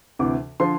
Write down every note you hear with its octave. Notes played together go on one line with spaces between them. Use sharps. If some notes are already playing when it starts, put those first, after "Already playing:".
D2 C3 E3 D6
D3 F3 C6